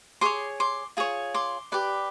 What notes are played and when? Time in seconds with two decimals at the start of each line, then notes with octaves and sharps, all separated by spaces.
0.21 G#4 C#5 C6 D6
0.60 C6 D6
0.97 F4 G#4 C#5
1.34 C6 D6
1.72 G4 B4 D5